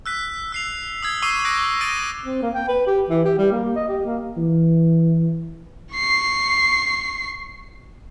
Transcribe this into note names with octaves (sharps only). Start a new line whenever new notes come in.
E6 F#6 B6
E6 C7 F7
D#6 E6 G#6
C#6 D6 E6 C7 D#7 G7
C#6 D#6 F#6 A#6 D7
D#6 E6 A6 A#6 D7 D#7
C4
A#3
G5
B4
G4
E3
G4
G3
A#3
D#5
G4
A#3
E3
C#6 C7